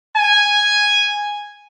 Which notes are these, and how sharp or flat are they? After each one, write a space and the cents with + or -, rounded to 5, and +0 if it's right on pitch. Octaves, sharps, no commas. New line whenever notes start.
G#5 -5